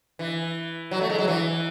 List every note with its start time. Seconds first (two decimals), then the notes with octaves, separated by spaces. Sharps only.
0.19 E3
0.91 F#3
1.01 A3
1.10 G#3
1.18 F#3
1.28 E3